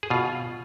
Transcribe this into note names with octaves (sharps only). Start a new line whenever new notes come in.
G#4
B2 F4